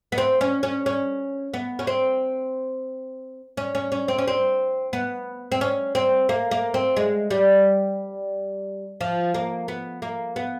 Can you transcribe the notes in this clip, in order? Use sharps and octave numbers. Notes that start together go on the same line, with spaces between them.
B3
C4
C#4
C#4
C#4
B3
C#4
C4
C#4
C#4
C#4
C4
C#4
C4
B3
C4
C#4
C4
A#3
A#3
C4
G#3
G3
F3
A#3
B3
A#3
B3